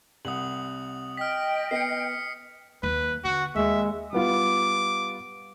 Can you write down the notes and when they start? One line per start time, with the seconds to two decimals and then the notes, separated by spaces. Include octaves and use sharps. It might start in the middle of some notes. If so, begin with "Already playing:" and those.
0.25 C2 F#5 D#6 F#7
1.17 D#5 G5 F6 B6
1.71 B3 C7 C#7
2.83 D#2 F#3 B4
3.25 D3 F#4
3.56 D#2 G#3 E5
4.13 G3 B3 F4 D6